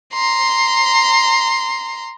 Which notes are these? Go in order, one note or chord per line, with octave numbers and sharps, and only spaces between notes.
A#5 C6